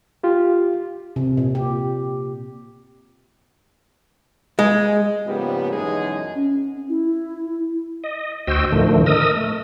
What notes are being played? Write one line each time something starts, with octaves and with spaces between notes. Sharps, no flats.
F4 G4
C3
A#2
G4
G#3
G#2 C#3 F3 G3 A#3 B3
F#2 B2 E3 G#3 D#4 G#4
C#4
E4
D#5
D2 F#4 C5 D#5 G5 E6
A2 D3 D#3 F3 A3
A#4 D#5 D#6 E6
A3